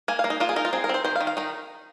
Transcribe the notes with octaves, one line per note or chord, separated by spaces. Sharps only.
A#3 G#5
F5
A#3
D#4
A#3 F4
G#4
D#4 A#4
F4
C4 G#4
A#4
C4 C5
D#3 C5
F5
D#3
F5
D#3 D#4